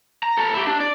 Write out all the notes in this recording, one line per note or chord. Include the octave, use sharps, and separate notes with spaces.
A#5
A4 A#5
E4 G4
D4
D5